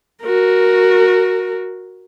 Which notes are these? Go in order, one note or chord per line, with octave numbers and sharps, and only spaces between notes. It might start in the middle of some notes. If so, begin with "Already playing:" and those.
F#4 A#4